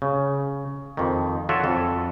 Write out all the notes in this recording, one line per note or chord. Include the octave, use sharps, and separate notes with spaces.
C#3
F2 D#3
F4 F#4 A4 C#5 D5 E5
F2 A4